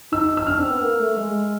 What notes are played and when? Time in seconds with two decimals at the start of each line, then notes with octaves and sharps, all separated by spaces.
0.12 D#4 E6
0.37 E6
0.47 D4 F6
0.59 C4
0.70 B3
0.82 A#3
0.99 A3
1.17 G#3